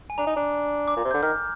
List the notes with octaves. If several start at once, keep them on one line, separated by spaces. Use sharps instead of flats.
G#5
D4 A#5
D#4
D4
D6
A#2
C3
G6
D3
D#3 F6